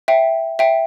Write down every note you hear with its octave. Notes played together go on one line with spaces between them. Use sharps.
E5 G5
E5 G5